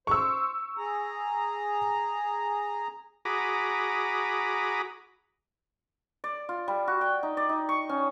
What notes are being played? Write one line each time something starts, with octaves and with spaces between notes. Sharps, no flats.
C5 C#6 E6
G#4 A#5
F#4 G#4 A#5 B5 D6 D#6
D5
F4
G3
F#4
G5
D#4
D5
D#4
C#6
C#4